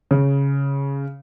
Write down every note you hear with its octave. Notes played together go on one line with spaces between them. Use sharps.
C#3